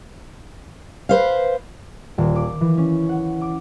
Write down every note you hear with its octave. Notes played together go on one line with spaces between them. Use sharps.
B4 C5 F5
D#1
D6
E3
C#4
F#5
D6